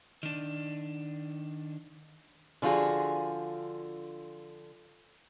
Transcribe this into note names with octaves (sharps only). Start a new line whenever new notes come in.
D#3 D4
D3 F3 F4 F#4 G#4